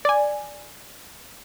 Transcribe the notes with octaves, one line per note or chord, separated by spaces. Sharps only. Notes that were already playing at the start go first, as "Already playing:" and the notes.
D5 G#5